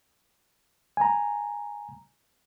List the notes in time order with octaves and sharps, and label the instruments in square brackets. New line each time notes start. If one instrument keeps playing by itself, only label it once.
[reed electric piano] G#5 A#5